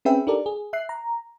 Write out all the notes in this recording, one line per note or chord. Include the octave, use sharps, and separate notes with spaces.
C4 C#4 G#4 B4 E5 G5
D4 D#4 G4 A4 A#4 D5
G#4
E5 F#6 C7
A#5